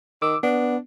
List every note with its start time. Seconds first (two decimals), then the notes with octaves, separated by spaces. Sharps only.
0.22 D#3 D6 E6
0.43 B3 D4